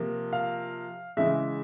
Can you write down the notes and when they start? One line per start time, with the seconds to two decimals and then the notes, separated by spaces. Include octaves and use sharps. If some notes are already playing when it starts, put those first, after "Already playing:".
Already playing: C3 F3 A#3
0.33 F5
1.17 C#3 E3 G#3 E5